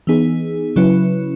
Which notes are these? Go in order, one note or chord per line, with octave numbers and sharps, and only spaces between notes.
E3 B3 D#4 G#4
C#3 F#3 C#4 E4 B4